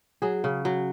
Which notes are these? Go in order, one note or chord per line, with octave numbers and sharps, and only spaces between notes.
F#3 G#4
C#3
F#3